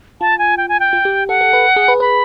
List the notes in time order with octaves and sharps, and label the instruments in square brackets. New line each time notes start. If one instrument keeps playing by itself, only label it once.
[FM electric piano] F4 [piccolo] A5
[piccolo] G#5
G5
G#5
G5
[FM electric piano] F4
G4
[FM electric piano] A4 [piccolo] F#5
[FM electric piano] A4
B4
G#4
B4
[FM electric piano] B4 [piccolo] B5